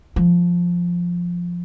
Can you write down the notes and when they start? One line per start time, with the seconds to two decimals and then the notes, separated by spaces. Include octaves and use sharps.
0.16 F3